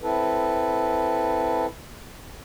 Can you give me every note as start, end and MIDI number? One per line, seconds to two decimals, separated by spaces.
0.02 1.66 60
0.02 1.66 64
0.02 1.66 69
0.02 1.66 71